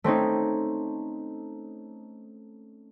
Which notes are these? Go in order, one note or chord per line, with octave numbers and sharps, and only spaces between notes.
A3 C4 C#4 D#4